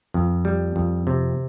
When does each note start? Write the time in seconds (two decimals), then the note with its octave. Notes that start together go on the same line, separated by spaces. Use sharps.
0.14 F2
0.45 G3
0.76 F2
1.07 C3